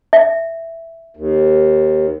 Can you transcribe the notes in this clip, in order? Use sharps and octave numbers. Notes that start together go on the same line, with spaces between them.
E5
D#2